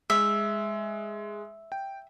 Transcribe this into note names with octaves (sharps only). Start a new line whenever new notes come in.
G#3 E5
G5